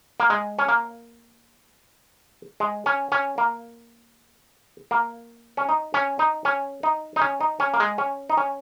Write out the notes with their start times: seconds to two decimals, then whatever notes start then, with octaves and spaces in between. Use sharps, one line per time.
0.20 A#3
0.30 G#3
0.59 C#4
0.68 A#3
2.60 G#3
2.86 C#4
3.12 C#4
3.38 A#3
4.91 A#3
5.57 C#4
5.69 D#4
5.94 C#4
6.19 D#4
6.45 C#4
6.83 D#4
7.16 D#4
7.21 C#4
7.41 D#4
7.60 C#4
7.74 A#3
7.80 G#3
7.98 C#4
8.30 D#4
8.37 C#4